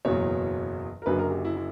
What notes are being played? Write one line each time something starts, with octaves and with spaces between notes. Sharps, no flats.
F#1 E2 B2 F#3 C#5
A#4
F#1 F#2 D3 F#3 B4
A#4
G4
E4
E4